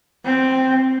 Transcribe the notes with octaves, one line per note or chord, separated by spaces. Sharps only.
C4